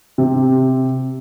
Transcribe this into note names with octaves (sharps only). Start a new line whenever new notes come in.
C3